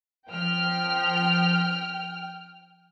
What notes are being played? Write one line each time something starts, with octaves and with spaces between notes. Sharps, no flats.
F3 G5 F6